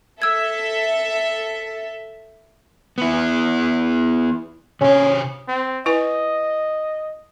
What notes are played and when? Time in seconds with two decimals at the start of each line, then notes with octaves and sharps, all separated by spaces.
0.22 A4 E5 E6 G#6
2.98 B3 E4
4.81 C3 C#4 C#5
5.48 C4
5.86 E4 B4 D#5 G#5